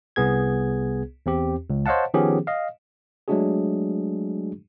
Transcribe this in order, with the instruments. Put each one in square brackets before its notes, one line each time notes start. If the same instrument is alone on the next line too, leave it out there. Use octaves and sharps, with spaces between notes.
[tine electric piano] C2 B3 G#4 G#6
E2 C4 G4
C#2
C5 C#5 D#5 F5 F#5 A5
D#3 F3 B3 C#4 G4 G#4
D#5 F5
F#3 G#3 A3 D4 F#4 G#4